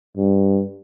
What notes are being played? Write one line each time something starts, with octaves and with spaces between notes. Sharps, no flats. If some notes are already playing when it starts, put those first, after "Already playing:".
G2